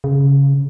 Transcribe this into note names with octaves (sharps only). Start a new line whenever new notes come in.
C#3